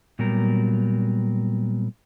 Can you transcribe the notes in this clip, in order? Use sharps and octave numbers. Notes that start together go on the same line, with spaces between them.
A#2 F#3 G3 B3 A#4